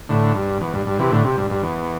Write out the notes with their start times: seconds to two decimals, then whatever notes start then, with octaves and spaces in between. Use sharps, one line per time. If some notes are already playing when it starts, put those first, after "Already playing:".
0.09 A2 D3
0.35 G2
0.61 E2
0.74 G2
0.86 G2
0.99 C3 E3
1.12 A2 D3
1.24 C3
1.37 G2
1.50 G2
1.63 E2